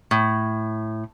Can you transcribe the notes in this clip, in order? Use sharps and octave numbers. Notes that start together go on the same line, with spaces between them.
A2